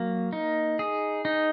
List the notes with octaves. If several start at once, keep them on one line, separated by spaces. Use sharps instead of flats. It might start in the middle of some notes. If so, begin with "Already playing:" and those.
Already playing: F#3 A#3
D#4
G#4
D#4